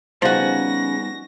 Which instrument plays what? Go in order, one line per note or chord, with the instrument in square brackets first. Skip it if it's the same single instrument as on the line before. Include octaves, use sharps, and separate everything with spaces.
[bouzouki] C#3 C#4 [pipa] F3 F#4 [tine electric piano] G3 B3 D#4 [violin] A#6